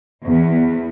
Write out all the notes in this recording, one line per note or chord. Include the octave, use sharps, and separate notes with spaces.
E2